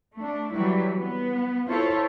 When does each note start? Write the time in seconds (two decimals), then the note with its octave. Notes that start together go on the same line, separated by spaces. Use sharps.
0.15 A3 D4
0.52 E3 F#3 G3 E4 B4
0.98 B3
1.67 E4 F4 A4 C5 C#5